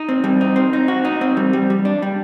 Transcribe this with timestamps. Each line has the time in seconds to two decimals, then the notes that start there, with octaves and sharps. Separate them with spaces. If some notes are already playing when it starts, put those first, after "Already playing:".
Already playing: D#4
0.09 C4
0.24 G3
0.41 D#4
0.56 C4
0.73 D#4
0.88 F#4
1.05 D#4
1.21 C4
1.37 G3
1.53 G3
1.70 G3
1.85 D4
2.02 G3